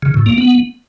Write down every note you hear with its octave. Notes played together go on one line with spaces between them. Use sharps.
C#3
A2
A#3
B3